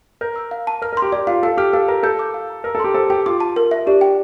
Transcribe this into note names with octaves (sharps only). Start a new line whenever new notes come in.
A#4 G6
E6
F5
A5
A#4 F6
A#4
C6
G4
G4 D5
F4 F5
A4 F5
G4 F6
A4 F5
A#4 A#5
A4 G6
D6
F5
A#5
A#4 E6
A4
G4 C6
A4 C5
G4 G5
F4 D6
A5
A#4
E5
D4 G4
G5